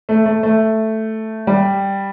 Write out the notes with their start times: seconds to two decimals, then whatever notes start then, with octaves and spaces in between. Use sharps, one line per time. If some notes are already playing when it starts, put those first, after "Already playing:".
0.09 A3
0.26 A3
0.43 A3
1.47 G3